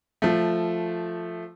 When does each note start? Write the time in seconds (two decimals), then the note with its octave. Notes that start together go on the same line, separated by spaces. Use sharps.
0.22 F3 A3